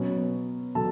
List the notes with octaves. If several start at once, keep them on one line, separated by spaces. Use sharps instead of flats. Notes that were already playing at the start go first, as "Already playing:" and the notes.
Already playing: B2 F#3 B3 C#4 B4
B2 F#3 A4 A5